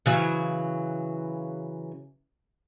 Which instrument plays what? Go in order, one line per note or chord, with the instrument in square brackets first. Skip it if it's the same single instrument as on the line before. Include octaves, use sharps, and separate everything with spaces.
[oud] C#3 E3 F#3